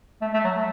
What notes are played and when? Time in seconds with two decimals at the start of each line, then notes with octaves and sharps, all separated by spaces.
0.21 A3
0.33 A3
0.44 F#3
0.55 A3